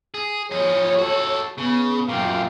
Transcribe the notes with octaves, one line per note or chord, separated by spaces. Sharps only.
G#4
F3 G#4 C#5
F#4 A4
C#3 B3
F#2 A#2 F5 G5